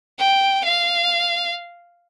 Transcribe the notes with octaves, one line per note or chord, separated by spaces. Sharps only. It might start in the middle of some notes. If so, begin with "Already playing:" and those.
G5
F5